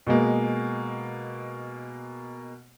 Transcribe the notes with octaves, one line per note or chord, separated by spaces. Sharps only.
B2 G#3 A#3